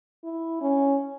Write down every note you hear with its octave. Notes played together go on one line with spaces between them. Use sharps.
E4
C#4